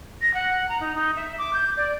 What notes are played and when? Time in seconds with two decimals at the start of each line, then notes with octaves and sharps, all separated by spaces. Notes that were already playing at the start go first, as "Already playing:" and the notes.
0.22 A#6
0.34 F#5
0.69 A#5
0.81 D#4
0.95 D#4
1.16 E5
1.38 D6
1.53 G6
1.77 D5